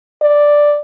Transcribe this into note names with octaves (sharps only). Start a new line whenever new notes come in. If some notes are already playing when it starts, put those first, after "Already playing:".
D5